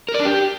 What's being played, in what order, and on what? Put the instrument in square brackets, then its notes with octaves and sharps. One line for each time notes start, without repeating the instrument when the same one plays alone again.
[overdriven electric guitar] A#4
D5
D4
G4